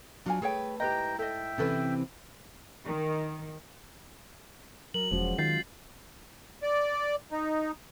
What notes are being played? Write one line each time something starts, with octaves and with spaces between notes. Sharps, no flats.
F2 F#3 D4 F4 G#5
A3 G#4 B4 C#5 G5
G#2 E4 G4 B4 D#5 G5 A#5
A4 D#5 E5 G5
C3 E3 C4 C#4 A4 B4
D#3
F#3 A#4 F#7
E1 F3 G#3 C#4 F#4
D#3 F4 G6 A6 C7
D5
D#4